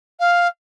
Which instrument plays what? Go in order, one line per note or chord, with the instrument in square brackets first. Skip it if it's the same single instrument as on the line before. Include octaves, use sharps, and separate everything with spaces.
[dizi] F5